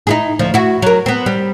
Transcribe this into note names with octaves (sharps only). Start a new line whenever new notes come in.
D#4 E4 G#4
D2 F3
E4 F#4
F#3 A#4
B3 C4
G3